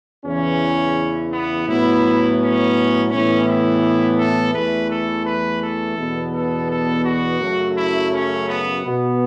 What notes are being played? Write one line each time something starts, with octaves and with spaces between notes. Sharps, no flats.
E2 C#3 E3 C#4
B3
A2 F#3 B3 E4
C#4
A2 E3 B3 C#4
E4
A4
E2 E3 A3 B4
A4
B4
A4
E2 B2 B3
A4
A4
F#4
F#2 C#3 F#3 A3
E4
C#4
B3
B2 B3